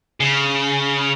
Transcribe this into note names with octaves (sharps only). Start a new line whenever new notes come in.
C#3